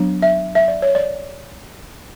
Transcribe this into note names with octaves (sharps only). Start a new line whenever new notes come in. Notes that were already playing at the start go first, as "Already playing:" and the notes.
Already playing: F#3 B3 D4
E5
E5
D5
C#5
D5